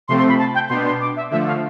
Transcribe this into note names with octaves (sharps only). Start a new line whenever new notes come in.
C3 F3 A3 C4 C6
C6
B5
A5
G5
B2 B3 D4 C6
C6
D6
E5
D3 F3 A3 E5
F5